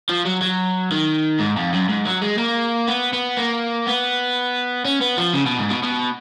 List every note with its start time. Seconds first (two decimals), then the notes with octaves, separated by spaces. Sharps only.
0.10 F3
0.26 F#3
0.42 F#3
0.92 D#3
1.40 G#2
1.57 F2
1.74 F#2
1.89 G#2
2.06 F#3
2.22 G#3
2.38 A#3
2.88 B3
3.13 B3
3.37 A#3
3.87 B3
4.85 C#4
5.01 B3
5.18 F3
5.34 C#3
5.46 B2
5.58 G#2
5.70 B2
5.83 B2